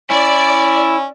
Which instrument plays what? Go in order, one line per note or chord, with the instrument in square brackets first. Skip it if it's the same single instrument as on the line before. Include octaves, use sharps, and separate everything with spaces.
[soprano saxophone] C#4 [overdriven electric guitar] E4 [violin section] D5